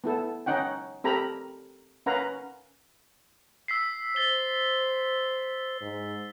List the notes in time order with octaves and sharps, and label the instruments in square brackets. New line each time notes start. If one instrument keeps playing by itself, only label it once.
[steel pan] B3 E4 A4
C#4 D#4 F#5 G5
C4 G4 A4 A#4 A#5 B5
C#4 A#4 B4 F5 F#5 A#5
[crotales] E6 B6 C7
[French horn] C5 [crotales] A6 G7
[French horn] G#2